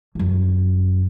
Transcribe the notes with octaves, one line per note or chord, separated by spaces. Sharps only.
G1 F#2